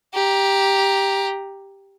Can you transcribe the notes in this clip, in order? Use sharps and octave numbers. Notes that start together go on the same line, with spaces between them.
G4 A#5